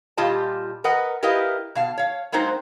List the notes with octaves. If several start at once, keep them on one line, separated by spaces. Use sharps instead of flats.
A#2 G3 F4 G4 D#5 A5
A#4 B4 D#5 F#5
E4 G4 A#4 B4 D#5 F5
B2 F5 A5
C#5 F5
F#3 G#3 A#3 C4 D#4 C5